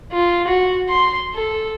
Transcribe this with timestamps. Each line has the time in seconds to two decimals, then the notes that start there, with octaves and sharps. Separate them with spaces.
0.13 F4
0.48 F#4
0.89 C6
1.34 A4